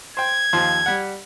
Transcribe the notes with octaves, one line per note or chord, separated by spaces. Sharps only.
C5 G5 G#6
D#2 F3 C5
G3 F#5